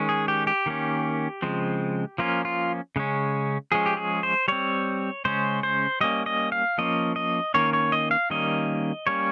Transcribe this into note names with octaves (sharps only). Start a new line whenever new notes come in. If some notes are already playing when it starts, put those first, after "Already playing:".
Already playing: D#3 G#3 C#4
G#4
G4
G4
D#3 A#3 C#4
C#3 F3 G#3 C4
F3 A#3 C#4 F4
F4
C#3 G#3 C#4
F3 G#3 C#4 G#4
G4
G#4
C5
G3 C4 C#5
C#3 G#3 C#4 C5
C5
G3 A#3 C#4 D#5
D#5
F5
F3 A#3 C#4 D#5
D#5
D#3 A#3 C#4 C#5
C#5
D#5
F5
D#3 G3 A#3 C#4 D#5
G3 A#3 C#4 C#5